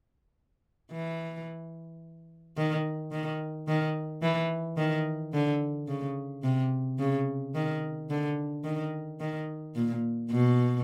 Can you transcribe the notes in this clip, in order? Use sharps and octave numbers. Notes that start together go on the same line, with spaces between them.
E3
D#3
D#3
D#3
E3
D#3
D3
C#3
C3
C#3
D#3
D3
D#3
D#3
A#2
B2